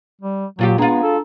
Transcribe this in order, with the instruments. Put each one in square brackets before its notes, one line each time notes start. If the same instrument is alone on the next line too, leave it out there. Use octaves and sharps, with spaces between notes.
[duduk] G3
[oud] A#2 F4 G4 [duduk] F#3
[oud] G#3 F4 [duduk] B3 [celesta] D4 A#5
[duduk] A4